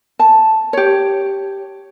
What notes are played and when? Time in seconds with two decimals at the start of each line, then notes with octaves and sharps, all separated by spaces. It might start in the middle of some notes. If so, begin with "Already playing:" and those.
0.19 A5
0.73 G4 C#5